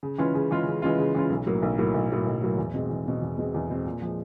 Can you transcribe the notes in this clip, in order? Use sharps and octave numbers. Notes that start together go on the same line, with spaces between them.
C#3
E3 G#3 C#4 F4
C#3
E3 G#3 C#4 F4
C#3
E3 G#3 C#4 F4
C#3
E3 G#3 C#4 F4
B1
A2 F#3 A#3
B1
A2 F#3 A#3
B1
A2 F#3 A#3
B1
A2 F#3 A#3
E2
B2 G#3 C4
E2
B2 G#3 C4
E2
B2 G#3 C4
E2
B2 G#3 C4
A#2
F3 G#3